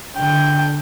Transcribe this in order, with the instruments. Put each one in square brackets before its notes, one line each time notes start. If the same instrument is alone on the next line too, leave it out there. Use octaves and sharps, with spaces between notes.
[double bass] D3 [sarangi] G5